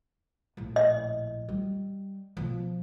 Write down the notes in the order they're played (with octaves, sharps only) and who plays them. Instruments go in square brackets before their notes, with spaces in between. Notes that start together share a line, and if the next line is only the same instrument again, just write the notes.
[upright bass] A#1 A2
[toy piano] D#5
[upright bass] G3
B2 F3